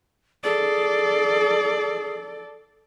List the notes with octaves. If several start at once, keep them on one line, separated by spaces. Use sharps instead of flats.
G#4 A4 D5